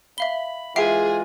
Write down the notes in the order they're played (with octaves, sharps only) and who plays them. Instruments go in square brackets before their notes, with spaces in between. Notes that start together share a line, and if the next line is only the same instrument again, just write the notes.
[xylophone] E5 F5 G7 [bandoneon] B5
[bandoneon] E3 G#3 F4 [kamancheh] G#4 [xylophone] E5 C7 D7